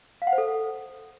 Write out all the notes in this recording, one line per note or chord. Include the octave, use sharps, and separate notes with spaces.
F5
F#5
C5
A4